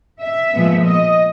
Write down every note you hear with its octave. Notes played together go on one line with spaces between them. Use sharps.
E5
A#2 F3 G#3 B3
D#5